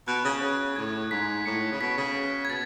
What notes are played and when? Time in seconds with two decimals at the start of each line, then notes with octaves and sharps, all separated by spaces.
0.08 B2 F#6
0.24 C#3
0.42 C#3
0.76 A2 G#6
1.11 G#2 B6
1.45 A2 C#7
1.72 C#3
1.81 B2 B6
1.98 C#3
2.45 G#6
2.50 B2 A6